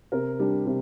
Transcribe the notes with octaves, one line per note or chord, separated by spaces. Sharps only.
C3 A#4
G3 D4
C3